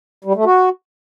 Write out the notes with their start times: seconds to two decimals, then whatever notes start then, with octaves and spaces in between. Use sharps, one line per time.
0.24 G3
0.35 A3
0.45 F#4